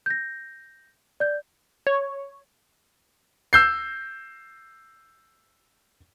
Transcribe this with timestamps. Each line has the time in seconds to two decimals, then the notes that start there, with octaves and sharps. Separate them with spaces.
0.06 G6 A#6
1.20 D5 G6
1.87 C#5
3.53 E6 G6 C7